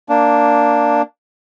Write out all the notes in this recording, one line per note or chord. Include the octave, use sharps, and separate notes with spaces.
A#3 D4